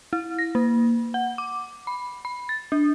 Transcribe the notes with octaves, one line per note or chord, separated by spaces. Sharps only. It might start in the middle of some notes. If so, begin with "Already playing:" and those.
E4
A#6
A#3
F#5
D6
B5
B5
A6
D4